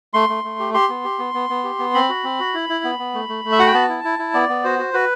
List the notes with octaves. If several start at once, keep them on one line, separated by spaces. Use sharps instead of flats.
A3 C6
A3
A3
G4
G4 C6
B3
G4
B3
B3
B3
G4
B3
C4 B5
F#4
C4
F#4
E4
E4
B3
B3
A3
A3
A3
E5
F#4 F#5
G5
B3 A5
E4
E4
E4
B3 D5
B3
F#4 C5
F#4
F#4 B4